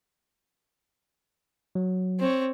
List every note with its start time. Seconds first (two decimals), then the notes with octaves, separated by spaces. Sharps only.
1.75 F#3
2.20 C4 C#5